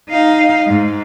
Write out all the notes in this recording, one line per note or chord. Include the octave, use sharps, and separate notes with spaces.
D#4 F5
G#2